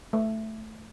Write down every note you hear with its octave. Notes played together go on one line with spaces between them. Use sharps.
A3